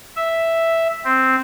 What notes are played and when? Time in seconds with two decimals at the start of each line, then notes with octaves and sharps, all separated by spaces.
0.16 E5
1.05 C4